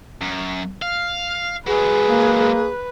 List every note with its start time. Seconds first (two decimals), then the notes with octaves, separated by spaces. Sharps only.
0.21 F#2
0.82 F5
1.67 F#3 G#3 G#4 B4
2.08 A#3